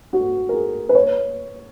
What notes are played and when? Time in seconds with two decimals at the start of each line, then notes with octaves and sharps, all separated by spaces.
0.13 F#4
0.49 A#4
0.53 G#4
0.89 B4
0.95 C#5